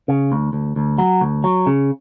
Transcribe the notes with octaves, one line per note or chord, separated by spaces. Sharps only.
C#3
D2
D2
D2
F#3
D2
F#3
C#3